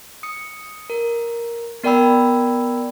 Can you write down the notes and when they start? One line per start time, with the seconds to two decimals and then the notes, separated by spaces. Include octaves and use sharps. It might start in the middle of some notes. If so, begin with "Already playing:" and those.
0.23 D#6 C#7
0.90 A#4
1.84 B3 A#4 D5 G5 B5 E6